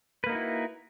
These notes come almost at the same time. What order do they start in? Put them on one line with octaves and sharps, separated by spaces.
B4 A#3 D#4 F#4 E4